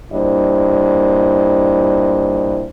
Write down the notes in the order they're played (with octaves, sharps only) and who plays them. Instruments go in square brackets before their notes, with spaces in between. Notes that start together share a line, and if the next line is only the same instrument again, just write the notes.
[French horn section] G2 A#2 E4 C5 D#5